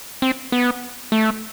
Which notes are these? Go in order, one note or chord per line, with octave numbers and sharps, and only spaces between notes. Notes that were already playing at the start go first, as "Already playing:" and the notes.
C4
B3
A3